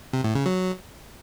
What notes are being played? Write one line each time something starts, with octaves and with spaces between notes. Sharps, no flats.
C3
A2
C#3
F#3